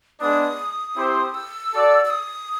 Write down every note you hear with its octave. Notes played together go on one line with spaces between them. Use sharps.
G#3 B3 D4 D#6
C4 E4 G4 C5
E6
F#4 A4 D5
E6
D#6